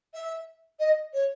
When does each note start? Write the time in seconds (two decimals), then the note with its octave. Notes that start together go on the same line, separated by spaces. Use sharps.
0.14 E5
0.79 D#5
1.14 C#5